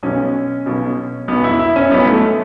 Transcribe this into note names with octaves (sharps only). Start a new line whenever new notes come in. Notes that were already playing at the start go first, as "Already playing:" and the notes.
B1 B2 C#4
B1 B2
B1 B2 B3
E4
E4
C#4
B1 B2 B3
A3